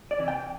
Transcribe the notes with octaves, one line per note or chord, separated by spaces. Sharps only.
D5
C3 E3
G5